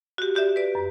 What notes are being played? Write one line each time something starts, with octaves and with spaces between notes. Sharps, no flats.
F#4 G4
F#4 G4 D5 E5
B4 D5
F#2